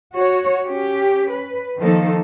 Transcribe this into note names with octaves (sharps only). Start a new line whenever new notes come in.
F#4 C#5
C#4 G4
B4
D#3 F3 A#3 D#4 A4